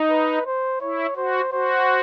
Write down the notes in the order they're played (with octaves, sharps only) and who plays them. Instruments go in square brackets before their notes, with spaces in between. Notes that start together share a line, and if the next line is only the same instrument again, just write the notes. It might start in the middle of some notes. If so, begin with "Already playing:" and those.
Already playing: [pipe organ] D#4
[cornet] B4
C5
[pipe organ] E4 [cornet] C#5
[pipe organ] F#4 [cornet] C5
[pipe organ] F#4 [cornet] C5